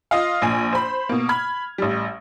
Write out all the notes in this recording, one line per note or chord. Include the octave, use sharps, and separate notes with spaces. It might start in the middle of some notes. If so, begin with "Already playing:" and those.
F4 D#5 F5
A#1 G#5
C5 B5
B2 A#3
B5 F6 G#6
A1 G3